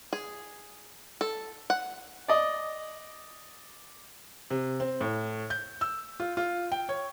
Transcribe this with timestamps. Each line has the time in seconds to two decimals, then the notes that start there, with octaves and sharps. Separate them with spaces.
0.13 G#4
1.21 A4
1.70 F#5
2.28 D5 D#5
4.50 C3
4.80 C4
5.01 A2
5.50 G6
5.81 E6
6.20 F4
6.37 F4
6.72 G5
6.89 C#5